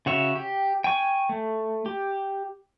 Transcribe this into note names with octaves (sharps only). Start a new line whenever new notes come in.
C#3 F#4 C#5 E5
G4
G5 G#5 C#6
A3
G4